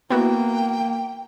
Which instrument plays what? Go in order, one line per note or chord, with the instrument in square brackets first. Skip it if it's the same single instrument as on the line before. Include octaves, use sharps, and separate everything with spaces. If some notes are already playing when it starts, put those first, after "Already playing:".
[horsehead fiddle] A#3 [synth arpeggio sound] B3 E4 F#4 [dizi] G5